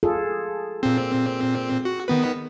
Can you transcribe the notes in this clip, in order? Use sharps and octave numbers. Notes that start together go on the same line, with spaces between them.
F4 G#4 A4
A#2 C4
F#4
D#3 B3 B4